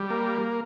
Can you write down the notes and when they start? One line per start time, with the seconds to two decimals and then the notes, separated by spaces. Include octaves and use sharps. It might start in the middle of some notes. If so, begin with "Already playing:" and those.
Already playing: G3
0.10 A#3